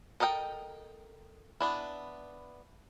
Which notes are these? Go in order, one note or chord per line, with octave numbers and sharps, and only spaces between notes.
A4 A#4 D#5 F5 G5
B3 D4 E4